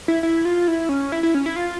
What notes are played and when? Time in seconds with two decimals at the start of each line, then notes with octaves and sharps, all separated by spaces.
0.08 E4
0.23 E4
0.45 F4
0.68 E4
0.89 C#4
1.12 E4
1.23 E4
1.35 C#4
1.46 E4
1.56 F4